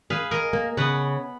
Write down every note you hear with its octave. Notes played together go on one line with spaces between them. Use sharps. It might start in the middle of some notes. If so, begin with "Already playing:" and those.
G#4 B4 F5
A#4 D#5 G#5
A#3
C#3 B3 B4 F#5